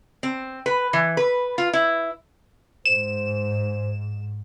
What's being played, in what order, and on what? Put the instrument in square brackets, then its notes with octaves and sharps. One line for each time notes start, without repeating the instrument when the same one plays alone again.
[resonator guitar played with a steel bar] C4
B4
E3
B4
F4
E4
[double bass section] G#2 [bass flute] C5 [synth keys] E7